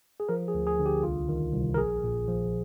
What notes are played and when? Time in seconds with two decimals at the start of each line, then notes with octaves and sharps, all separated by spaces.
0.20 G#4
0.29 F3 A#4
0.48 G#4
0.54 D2
0.67 G#4
0.79 D3
0.86 G4
1.03 C2 F4
1.29 D#3
1.54 C2
1.74 A#4
1.78 A#1 G#4
2.04 A#2
2.28 F3